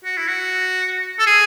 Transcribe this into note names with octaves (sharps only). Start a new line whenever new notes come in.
F#4
E4
F#4
A4
G#4